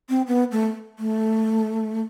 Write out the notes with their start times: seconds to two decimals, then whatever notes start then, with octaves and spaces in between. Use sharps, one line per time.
0.09 C4
0.27 B3
0.52 A3
0.99 A3